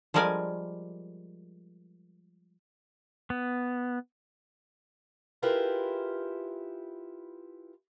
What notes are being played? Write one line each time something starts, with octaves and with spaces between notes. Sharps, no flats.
F3 G3 G#3 A#4 D5 G#5
B3
E4 F4 G4 G#4 A#4 B4